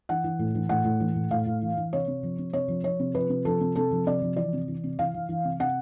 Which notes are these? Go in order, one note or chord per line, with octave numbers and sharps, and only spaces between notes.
E3 F#5
E3
A2
E3
A2 F#5
A2
E3
A2
A2 F5
A2
E3
E3
C3 C#5
C3
F3
C3
C3 C#5
F3
F3 C#5
C3
F3 B4
C3
F3 A4
C3
C3 A4
F3
C3 D5
F3
E3 D5
C3
E3
C3
E3 F5
E3
E3
C3
C3 F#5